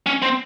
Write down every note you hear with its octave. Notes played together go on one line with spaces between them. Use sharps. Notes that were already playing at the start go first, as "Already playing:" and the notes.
C#4
C4